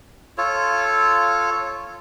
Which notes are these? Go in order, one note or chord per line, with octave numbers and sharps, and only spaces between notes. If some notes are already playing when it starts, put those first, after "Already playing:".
F4 A4 C#5